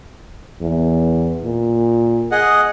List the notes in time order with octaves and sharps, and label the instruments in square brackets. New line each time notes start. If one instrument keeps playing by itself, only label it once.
[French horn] E2
A#2
[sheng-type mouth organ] G#4 D#5 F#5